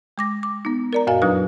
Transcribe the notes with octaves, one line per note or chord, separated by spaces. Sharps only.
G#3 D6 A#6
D6
B3 D#4
A#4 D5 A#5
F#2 A#2 F#4 D#5 F5 G#5
F2 F#3 D4 D#4 B4 D#6